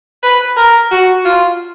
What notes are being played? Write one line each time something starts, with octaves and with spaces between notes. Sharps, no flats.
B4
A#4
F#4
F4